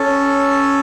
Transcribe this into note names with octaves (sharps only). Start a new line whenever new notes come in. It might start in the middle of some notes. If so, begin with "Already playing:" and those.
Already playing: C#4 A4